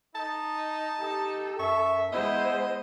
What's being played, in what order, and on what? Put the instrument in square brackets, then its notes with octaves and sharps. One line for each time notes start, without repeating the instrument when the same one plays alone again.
[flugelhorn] D#4 [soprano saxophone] A5
[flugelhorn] D#4 [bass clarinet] G4 [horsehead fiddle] A4
[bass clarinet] F#2 [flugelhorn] E5 [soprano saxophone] C#6
[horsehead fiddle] G#3 C5 [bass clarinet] B3 [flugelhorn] E4 [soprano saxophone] D#5